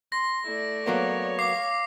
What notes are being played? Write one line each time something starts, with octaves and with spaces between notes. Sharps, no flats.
C6 A#6
A3 E4 D5
F#3 A#3 B3 C#5
F5 D6 C7